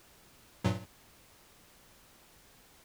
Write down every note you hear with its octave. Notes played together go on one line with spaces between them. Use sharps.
G2 A#2 F#3